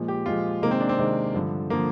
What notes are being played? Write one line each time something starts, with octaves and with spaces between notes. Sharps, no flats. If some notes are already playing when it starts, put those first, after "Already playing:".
Already playing: A#2 F3 G#3
G4
A#2 F3 G#3 F4
C3 D#3 G#3 A#3
C4
D4
C4
C3 D#3 G#3
G2 D3 F3
D3 F3 A#3